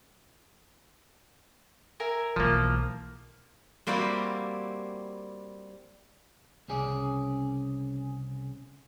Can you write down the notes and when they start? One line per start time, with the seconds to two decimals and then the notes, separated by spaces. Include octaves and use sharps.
2.00 A#4 E5 G#5
2.36 B1 E3 F3 A#3
3.87 G3 A#3 C4 E4 F#4 G4
6.68 C2 C#3 C#4 G#4 D5